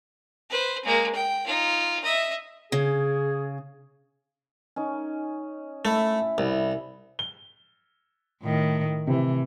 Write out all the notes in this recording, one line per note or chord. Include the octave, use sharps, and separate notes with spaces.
B4 C5
G#3 A#3
G5
D#4 F4
D#5 E5
C#3 G#4
C#4 D#4
A3 E4 E5
C2
G7
A2 D#3
C3 E3